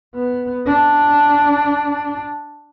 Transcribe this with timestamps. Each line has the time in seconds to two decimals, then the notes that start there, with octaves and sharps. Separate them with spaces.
0.15 B3
0.66 D4